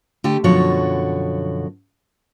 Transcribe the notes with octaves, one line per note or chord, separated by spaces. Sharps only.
D3 A3 G4
F#2 B2 D3 F3 F#4 C#5